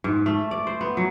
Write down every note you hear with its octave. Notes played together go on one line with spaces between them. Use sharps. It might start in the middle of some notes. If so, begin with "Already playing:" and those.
G#2
A3
D5
C5
B3
F#3